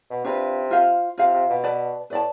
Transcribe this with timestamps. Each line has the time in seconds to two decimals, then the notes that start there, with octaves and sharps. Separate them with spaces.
0.10 B2
0.25 C3 D4 F4 B4
0.71 F4 C5 F5
1.18 C3 F4 C5 F5
1.33 C3
1.49 B2
1.64 B4 D5 A5
2.10 A2 B4 D5 A5